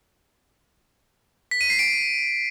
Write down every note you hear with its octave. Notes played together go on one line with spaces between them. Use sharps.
B6
D#7
C7
D7